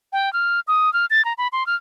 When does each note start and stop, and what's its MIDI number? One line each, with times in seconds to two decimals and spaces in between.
0.13 0.32 79
0.33 0.60 89
0.68 0.92 87
0.93 1.06 89
1.10 1.24 93
1.25 1.33 82
1.38 1.48 83
1.53 1.66 84
1.67 1.75 89